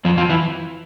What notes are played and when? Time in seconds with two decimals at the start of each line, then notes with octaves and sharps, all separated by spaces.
0.05 F2 F3
0.17 F2 F3
0.30 E3